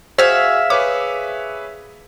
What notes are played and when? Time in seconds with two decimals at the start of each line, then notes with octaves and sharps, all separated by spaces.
0.18 F#4 G#4 C5 E5 F5 G#6
0.70 G#4 B4 C#5 D6